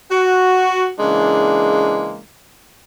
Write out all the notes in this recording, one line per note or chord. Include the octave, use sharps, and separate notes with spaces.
F#4
C#3 E3 G#3 A#3 D4